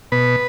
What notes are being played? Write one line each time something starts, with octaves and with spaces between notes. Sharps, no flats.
B2 B4